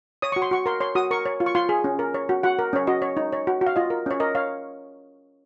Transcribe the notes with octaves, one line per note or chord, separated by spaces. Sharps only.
C#5 D#6
F#4 C#6
C6
F#4 C#6
A#4 C6
C#5 C6
F#4 D#6
A#4 C#6
C#5
F4
C#6
F4 C6
G#4
C#4
A#4
C#5
F#4
F#4 F#5
A#4
C#4 C#5
F#4 D#5
C#5
D#4
C#5
F#4
F#4
F5
F4 D#5
A#4
C#4 C#5
A#4 D#5
C#5 F5